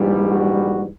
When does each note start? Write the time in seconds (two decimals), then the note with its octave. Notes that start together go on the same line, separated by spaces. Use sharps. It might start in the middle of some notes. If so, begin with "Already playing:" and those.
Already playing: A#1 G#2 E3 G3
0.30 F#4